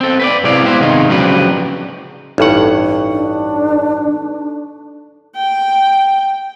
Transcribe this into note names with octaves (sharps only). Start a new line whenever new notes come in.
C4 A4
B4 C5 D5
C3 G#3 E4 D5 F5
B3 E4 G4 C5
C3 D#3 G#3 D#4 F4
C#3 F3 F#3 D4 G4 B4
A1 G2 D#4 A4 F#5 C#6
D4
G5